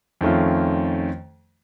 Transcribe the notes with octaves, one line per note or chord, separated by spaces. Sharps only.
F2 D#3 A3 C#4 F4